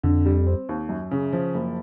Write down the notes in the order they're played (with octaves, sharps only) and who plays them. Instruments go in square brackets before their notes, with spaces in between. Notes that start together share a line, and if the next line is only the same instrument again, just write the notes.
[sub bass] F2 [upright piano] D3
[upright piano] G3
C4
D#2
F#2
C#3
F3
F#1